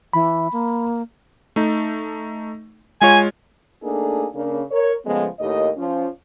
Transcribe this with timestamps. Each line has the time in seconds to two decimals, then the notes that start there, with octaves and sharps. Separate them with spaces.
0.13 E3 B5
0.52 A#3
1.56 A3 D#4
3.01 G#3 F4 C#5 G#5
3.83 A3 A#3 D4 D#4 G#4 A4
4.34 C#3 A#3 D4
4.71 A#4 C#5
5.05 C#3 F3 G#3 A3 B3
5.40 D#2 A2 G4 A#4 D#5
5.77 F3 C#4